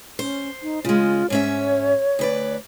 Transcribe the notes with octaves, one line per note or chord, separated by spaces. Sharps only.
C#4 C5
D#4
C#3 G#3 F4
G#2 C#4 C#5 E5
D2 B4 D5